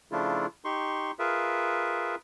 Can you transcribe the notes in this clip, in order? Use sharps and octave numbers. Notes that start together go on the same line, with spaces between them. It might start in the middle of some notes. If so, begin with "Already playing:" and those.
C#3 F3 A3 D4 E4 F4
D#4 G4 C6 C#6
F4 G#4 A#4 B4 E5